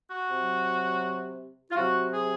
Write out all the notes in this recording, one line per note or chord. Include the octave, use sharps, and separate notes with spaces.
F#4
C3 F#3
F4
C3 F#3 F#4
G#4